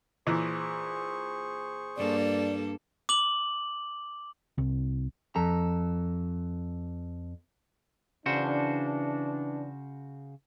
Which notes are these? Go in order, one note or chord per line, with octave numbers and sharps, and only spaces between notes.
A#2 E3 G#4 C5 C#6
G2 A#3 A4 D5
D6 F#7
C2
F2 A4 A#5
C#3 E3 D4 F#4 C5